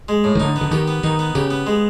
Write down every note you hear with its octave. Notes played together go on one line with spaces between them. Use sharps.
G#3
A2
D#3
D3 D#4
B3
D3
D#3 G4
B3
D#3 D#4
B3
C#3 G4
B3
G#3